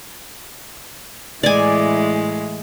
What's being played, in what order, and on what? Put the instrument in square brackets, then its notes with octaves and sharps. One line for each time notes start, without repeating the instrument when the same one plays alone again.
[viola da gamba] A2 E3 G#3 [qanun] D5 G#5